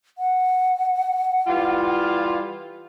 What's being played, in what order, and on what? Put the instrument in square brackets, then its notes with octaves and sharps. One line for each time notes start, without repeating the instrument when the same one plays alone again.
[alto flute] F#5
[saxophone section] E3 G3 F4